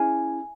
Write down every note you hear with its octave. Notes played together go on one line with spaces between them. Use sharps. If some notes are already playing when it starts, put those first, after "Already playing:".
Already playing: C#4 E4 G#4 G#5